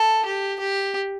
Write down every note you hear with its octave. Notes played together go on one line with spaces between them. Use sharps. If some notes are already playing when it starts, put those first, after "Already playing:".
Already playing: A4
G4
G4